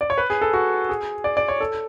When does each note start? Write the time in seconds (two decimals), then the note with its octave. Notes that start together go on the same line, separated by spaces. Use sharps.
0.01 D5
0.10 C#5
0.18 B4
0.30 G#4
0.42 A4
0.54 F#4
0.89 G#4
1.24 D5
1.37 D5
1.48 C#5
1.60 A4